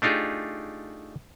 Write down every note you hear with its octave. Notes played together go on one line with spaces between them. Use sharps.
A3 D4 D#4 F4 G4 G#4